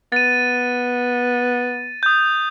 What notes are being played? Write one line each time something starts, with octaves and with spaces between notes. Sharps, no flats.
B3 A6 D#7
D#6 G6